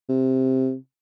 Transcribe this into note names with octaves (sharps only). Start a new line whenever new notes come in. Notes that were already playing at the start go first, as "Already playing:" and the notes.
C3